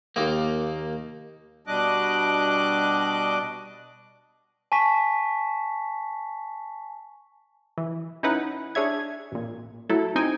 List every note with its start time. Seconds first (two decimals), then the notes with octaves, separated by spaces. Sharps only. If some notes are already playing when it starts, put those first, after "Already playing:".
0.16 D#2 A#3 D#4 D6
1.67 B2 G3 D4 D#5 D6 F#6
4.72 G#5 A5 C#6 B6
7.78 E3
8.23 C#4 D#4 E4 B4 F#5
8.75 D4 G#4 C#5 E5 G#6
9.32 A1 A#2
9.89 F#3 A3 E4 A4
10.16 C4 D#4 G5 G#5